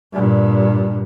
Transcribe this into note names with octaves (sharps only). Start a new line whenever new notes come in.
G2 A#2